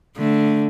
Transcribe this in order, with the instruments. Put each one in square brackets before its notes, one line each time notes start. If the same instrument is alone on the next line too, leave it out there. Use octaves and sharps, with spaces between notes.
[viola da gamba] D3 [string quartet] A3